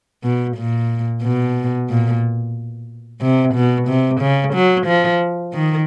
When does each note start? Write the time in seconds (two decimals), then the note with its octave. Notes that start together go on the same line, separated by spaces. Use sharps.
0.24 B2
0.57 A#2
1.23 B2
1.89 A#2
3.21 C3
3.54 B2
3.88 C3
4.21 C#3
4.54 F#3
4.87 F3
5.53 D#3